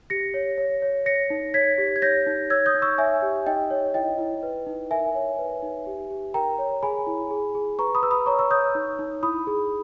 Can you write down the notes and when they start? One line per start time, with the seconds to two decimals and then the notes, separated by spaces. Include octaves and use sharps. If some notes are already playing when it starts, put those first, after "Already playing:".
0.10 G4 A#6 C#7
0.34 C#5
0.58 C#5
0.82 C#5
1.06 C#5 A#6 C#7
1.30 D#4
1.54 C#5 G#6 B6
1.78 G4
1.96 G#6
2.02 C#5 G6 A#6
2.26 D#4
2.50 C#5 E6 G#6
2.66 D#6 G6
2.75 D#4
2.82 C#6 E6
2.98 C#5 E5 G#5
3.22 G4
3.46 D#4 D#5 G5
3.71 C#5
3.94 E4 D#5 G5
4.18 E4
4.43 B4
4.66 D#4
4.91 A#4 E5 G#5
5.15 C#5
5.39 B4
5.62 D#4
5.87 G4
6.10 G4
6.34 A#4 G5 A#5
6.58 C#5
6.83 G#4 G#5 B5
7.07 E4
7.31 G#4
7.55 G#4
7.79 B4 A#5 C#6
7.95 B5 D#6
8.02 B4 E6
8.11 B5 D#6
8.26 C#5 A#5 C#6
8.39 C#6 E6
8.51 C#5 D#6 G6
8.75 D#4
8.99 D#4
9.23 E4 B5 D#6
9.47 G#4